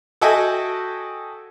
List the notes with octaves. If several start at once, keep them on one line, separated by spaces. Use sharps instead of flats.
F#4 A4 D#5 E5 G5 G#5